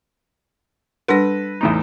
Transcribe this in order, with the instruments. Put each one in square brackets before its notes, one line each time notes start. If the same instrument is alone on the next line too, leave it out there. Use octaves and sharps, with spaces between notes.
[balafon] G3 D4 F#5 [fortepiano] A4 [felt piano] B4 A#6
[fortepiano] E2 A2 D#4